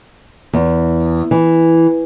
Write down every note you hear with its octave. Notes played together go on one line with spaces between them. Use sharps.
E2
E3